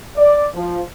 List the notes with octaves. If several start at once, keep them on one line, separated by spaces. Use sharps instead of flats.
D5
F3